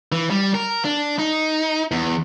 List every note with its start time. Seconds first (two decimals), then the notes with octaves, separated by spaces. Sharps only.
0.12 E3
0.30 G3
0.54 A#4
0.84 D4
1.19 D#4
1.92 E2